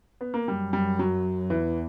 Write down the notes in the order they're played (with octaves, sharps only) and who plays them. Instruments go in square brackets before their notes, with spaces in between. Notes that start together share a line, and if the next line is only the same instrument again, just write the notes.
[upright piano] B3
A#3
[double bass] F#2 [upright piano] G3
[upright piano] G3
F#3
[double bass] E2 [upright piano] E3